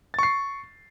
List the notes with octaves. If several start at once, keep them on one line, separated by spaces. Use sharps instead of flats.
C#6 A6 C7